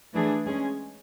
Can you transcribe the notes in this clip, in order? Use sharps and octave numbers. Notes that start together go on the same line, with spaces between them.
E3 A3 D4 G#4
G#3 C#4 G#4